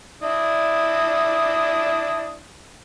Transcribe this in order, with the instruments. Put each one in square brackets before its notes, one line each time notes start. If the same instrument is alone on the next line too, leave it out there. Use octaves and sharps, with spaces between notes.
[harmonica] D4 E4 D#6